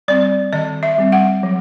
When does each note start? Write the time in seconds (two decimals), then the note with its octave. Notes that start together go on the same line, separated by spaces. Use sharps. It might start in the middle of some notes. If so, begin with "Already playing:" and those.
0.08 G3 C4 D5
0.53 D#3 D#5
0.83 E5
0.98 G3 C4
1.12 F#5
1.43 F#3